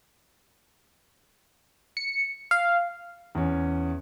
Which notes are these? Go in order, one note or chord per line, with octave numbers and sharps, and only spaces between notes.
C#7
F5
E2 C#4